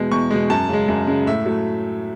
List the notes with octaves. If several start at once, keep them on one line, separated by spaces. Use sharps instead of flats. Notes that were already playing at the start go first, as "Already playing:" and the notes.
Already playing: E2 B2 G#3
E2 C#6
B2 G#3
F#2 A5
C#3 G#3
F#2
C#3 G#3
A2 E5
F#3 A3